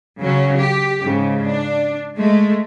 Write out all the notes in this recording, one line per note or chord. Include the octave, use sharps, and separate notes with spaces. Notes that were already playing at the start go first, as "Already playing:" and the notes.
C#3 F#3 C#4
G4
G#2 C#3
D4
G#3 A3